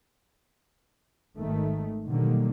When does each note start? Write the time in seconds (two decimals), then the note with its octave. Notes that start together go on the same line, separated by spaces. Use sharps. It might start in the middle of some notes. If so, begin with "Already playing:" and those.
1.37 G#1 D#3 A3
2.08 B2 D3 D#3 F#3 G3 A#3